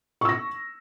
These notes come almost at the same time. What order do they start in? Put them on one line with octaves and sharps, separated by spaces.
C#6 E6 A#6